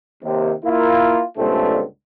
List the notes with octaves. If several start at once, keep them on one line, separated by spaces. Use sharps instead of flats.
D#2 C3
A#3 E4 F4
C#2 G2 A#2 D3 A3 C4